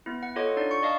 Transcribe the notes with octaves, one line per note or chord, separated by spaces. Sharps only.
B3 E4
F#5
F4 A4 C#5 D#5 F#5 D6
D4 D#4 D5
C#6 C#7
D5 D#5 F5 A5